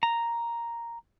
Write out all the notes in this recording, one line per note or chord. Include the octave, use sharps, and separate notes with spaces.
A#5